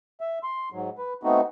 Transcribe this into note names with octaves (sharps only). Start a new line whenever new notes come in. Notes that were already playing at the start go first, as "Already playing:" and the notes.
E5
C6
G#2 F#3
B4
A3 B3 C4 D#4 F#4